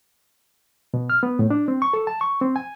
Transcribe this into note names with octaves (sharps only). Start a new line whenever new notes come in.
B2
F6
B3
A2
D4
C4
C#6
A4
A5
C#6
C4
G#5